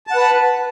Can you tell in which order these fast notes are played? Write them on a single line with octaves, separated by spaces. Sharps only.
A5 F#5 B4